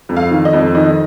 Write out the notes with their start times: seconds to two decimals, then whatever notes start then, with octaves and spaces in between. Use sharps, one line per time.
0.09 F2
0.17 F5
0.31 D#3
0.45 D#5
0.53 F2
0.75 D#3 D#5